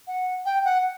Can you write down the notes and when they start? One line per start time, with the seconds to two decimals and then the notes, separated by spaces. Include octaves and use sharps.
0.07 F#5
0.46 G5
0.65 F#5